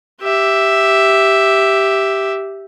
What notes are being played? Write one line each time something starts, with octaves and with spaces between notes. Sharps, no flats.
G4 E5